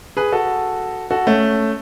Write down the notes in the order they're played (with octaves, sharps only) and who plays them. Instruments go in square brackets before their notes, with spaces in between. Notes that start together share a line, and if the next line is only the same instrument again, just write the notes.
[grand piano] G#4 B4
F#4 A4
F#4 A4
A3 C#4